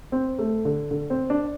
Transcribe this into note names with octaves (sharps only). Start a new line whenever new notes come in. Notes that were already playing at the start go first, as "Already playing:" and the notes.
C4
A3
D3
D3
C4
D4